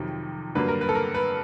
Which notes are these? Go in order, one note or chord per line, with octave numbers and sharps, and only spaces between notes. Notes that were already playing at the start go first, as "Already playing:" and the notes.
Already playing: F2 C3 D#3 F#3
G2 D3 F#3 A#3 B4
A#4
B4
A4
A#4
B4